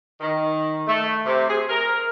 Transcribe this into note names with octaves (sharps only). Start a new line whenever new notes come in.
D#3
A3
C3
G#4
A#4